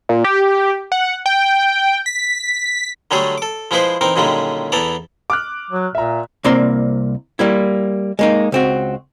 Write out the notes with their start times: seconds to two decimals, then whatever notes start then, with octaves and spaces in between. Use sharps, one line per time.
0.09 A#2
0.24 G4
0.92 F#5
1.26 G5
2.06 B6
3.11 D3 F#3 G3 A3 G#4 A4
3.38 A4 D6
3.71 F3 G#3 E4 G#4 B4 C5
4.01 E3 C4 D#4 A#4
4.16 F#2 A#2 D3 D#3 G3 G#3
4.72 E2 E3 B3 A4 D5 A#5
5.30 D6 F6 F#6
5.71 F#3
5.95 A#2 E5 A#5
6.44 C2 A#3 C4 D5 A#5 C6
7.39 G3 A#3 E4
8.19 G#3 A#3 D#4
8.52 C#2 C4 F#4